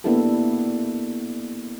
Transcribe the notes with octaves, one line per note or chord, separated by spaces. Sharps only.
A#3 B3 D4 E4 G4 A4